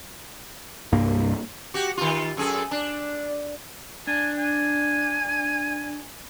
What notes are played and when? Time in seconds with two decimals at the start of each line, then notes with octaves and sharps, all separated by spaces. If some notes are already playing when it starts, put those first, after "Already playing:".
0.92 C2 G2 A#3
1.74 F#4 G4
1.97 D#3 F4
2.37 F#2 G#4 A4
2.71 D4
4.07 D4 G#5
4.38 G#5